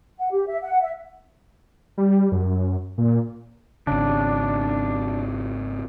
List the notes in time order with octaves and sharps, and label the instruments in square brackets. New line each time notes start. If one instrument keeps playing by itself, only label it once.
[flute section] F#5
G4
E5
F#5
E5
[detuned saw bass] G3
F#2
A#2
[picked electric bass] G#1 C#3 [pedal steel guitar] D4